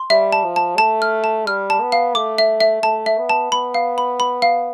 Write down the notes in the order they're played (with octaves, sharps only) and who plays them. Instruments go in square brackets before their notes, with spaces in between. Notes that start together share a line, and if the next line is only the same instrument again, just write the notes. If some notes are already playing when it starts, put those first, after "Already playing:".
Already playing: [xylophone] C6
[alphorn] G3 [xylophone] E5
[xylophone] A5
[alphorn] F3
[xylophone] A5
[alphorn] A3 [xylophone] A5
[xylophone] F6
A5
[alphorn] G3 [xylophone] F6
[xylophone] A5
[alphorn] B3
[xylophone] F5
[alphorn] A3 [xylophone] D6
[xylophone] E5
E5
[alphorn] A3 [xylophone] A5
[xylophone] E5
[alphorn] B3
[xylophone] A5
[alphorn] B3 [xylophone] B5
[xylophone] F5
B5
B5
F5